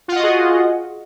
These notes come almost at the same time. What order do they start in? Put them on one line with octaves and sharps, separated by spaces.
F4 F#5 D#5 F#4 G#4